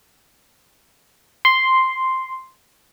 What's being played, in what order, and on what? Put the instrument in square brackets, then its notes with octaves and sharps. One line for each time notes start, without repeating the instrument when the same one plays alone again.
[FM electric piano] C6